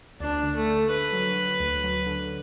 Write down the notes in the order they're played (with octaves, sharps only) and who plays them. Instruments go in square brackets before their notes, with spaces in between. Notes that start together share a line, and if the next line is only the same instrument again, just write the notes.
[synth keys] D2 [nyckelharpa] D4
[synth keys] D3
[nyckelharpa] A3
[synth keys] D3
[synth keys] D3 [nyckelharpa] B4
[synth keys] F#3
F#3
D2
F#3
D3